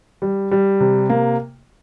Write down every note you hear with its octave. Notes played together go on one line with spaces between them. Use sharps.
G3
G3
C3
A#3